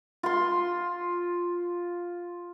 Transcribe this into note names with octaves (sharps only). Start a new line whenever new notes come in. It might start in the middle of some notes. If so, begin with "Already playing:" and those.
F4 C6